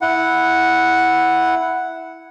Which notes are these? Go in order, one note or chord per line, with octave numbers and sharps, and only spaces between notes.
E4 F#5